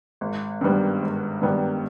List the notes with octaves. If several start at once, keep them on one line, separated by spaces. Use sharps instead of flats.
G#1
G2 D#3 G3 B3
G#1
G2 D#3 G3 B3